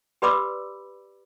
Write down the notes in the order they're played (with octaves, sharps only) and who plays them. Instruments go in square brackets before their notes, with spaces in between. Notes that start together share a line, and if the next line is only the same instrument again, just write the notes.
[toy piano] G4 B4 D5 B5 D6 E6